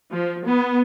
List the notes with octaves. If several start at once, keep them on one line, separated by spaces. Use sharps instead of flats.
F3
B3